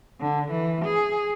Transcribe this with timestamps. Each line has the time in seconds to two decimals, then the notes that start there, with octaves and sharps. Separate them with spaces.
0.21 D3
0.50 E3
0.85 G#4